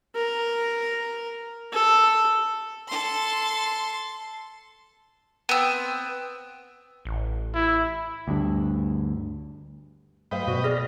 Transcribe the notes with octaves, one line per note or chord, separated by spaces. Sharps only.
A#4
A4
A4 C6
B3 C4
A1
E4
D2 G2
G2 F#3 A3 B4 C5 D#5 F5 G5
B2 F#4 C5 D5 F#5
G#4 D5 F6 A#6